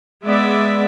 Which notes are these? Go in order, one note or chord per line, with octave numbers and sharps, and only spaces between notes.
G#3 B3 D5 E5